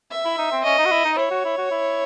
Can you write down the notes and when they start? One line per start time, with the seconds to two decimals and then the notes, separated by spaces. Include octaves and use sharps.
0.11 E5
0.25 E4
0.38 D#4
0.52 C4
0.64 C#4 D#5
0.78 D#4
0.86 F#4
0.91 E4
1.05 D#4
1.18 E4 C#5
1.31 F#4
1.45 E4
1.58 F#4
1.71 E4